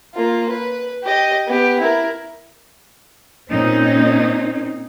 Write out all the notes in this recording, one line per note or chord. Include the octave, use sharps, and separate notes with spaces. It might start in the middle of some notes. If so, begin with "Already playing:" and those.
A#3 F4
B4
G4 D#5
B3 G4
E4 A#4
A#2 C4 C#4 D#4